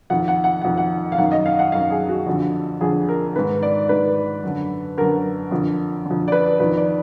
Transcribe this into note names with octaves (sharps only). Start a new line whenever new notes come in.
F2 D#3 F#5
F#5
F#5
F2 D#3 F#5
F#5
F5
F#2 D#3 F#5
D#5
F5
F#5
F#2 D#3 F5
G#4
F#4
F2 D3
F2 D3 G#4
A#4
G#2 D#3 B4
D5
G#2 D#3 B4
F#2 D3
F#2 D3 A#4
F2 D3
D3
F2
D5
B4
F2 D#3 B4
D5